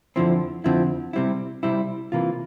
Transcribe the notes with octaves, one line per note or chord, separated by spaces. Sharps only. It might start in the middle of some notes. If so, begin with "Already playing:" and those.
F2 D3 F3 C4 E4
F2 D3 F3 C4 E4
C3 G3 C4 E4
C3 G3 C4 E4
C3 E3 A#3 F4